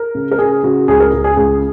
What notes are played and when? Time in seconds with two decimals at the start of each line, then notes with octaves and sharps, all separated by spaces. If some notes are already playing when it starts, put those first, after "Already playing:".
Already playing: A#4
0.15 C#3
0.31 A#4
0.39 C#3 G#4
0.63 C#3 F#4
0.88 C#2 G#4
1.00 A#4
1.13 C#2
1.24 G#4
1.37 C#2 G#4